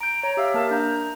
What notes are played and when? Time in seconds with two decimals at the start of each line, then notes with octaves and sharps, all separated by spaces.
0.01 A#5 G6 D7
0.23 C#5 A#5
0.37 G4 E5 F5 E6
0.54 A#3 A#4 A5
0.71 D4 A#5 G6